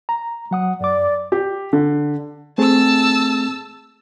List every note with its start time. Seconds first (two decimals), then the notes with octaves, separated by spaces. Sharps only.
0.09 A#5
0.51 F#3 F#5 D#6
0.81 F#2 D5 D6
1.32 G4
1.73 D3
2.58 A3 C4 G#4 A5 E6